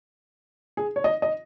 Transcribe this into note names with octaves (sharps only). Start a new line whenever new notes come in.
G#4
C#5
D#5
D#5